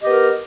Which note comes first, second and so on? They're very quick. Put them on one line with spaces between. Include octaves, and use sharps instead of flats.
D#5 G4 B3 A#4